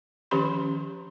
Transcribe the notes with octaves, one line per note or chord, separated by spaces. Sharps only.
D#3 F3 C#4 G4 B5 C6